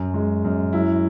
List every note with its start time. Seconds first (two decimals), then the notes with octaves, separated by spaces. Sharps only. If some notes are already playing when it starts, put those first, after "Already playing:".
Already playing: F#2
0.14 G#3
0.44 F#2
0.73 F#3 E4